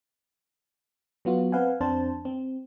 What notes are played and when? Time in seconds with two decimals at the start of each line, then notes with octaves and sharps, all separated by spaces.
1.25 F#3 B3 F4 F#4
1.52 C4 B4 F5 F#5 G#5
1.81 F2 C4 D4 C5 A5
2.25 C4